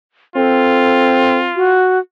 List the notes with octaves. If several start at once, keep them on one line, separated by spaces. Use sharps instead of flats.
C4 F4 A4
F#4